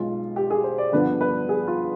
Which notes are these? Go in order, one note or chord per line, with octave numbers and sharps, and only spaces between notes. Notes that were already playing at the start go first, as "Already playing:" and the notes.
Already playing: B1 B2 G#3 F4
G4
G#4
C5
D5
G2 D3 F3 B3 B4
B4
G#4
F4